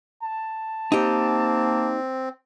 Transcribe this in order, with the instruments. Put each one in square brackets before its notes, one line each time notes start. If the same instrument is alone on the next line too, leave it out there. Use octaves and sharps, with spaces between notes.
[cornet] A5
[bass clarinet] A#3 [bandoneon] C4 [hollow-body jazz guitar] D#4 G4